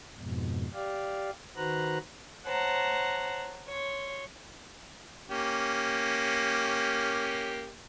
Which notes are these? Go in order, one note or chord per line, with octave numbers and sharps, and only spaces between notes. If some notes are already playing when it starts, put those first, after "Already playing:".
F2 G#2 B2
G4 D5 F5
D#3 F#4 B4 C5 A#5 F#6
C5 C#5 F#5 A5 A#5
C#5 C6
A#3 C#4 G4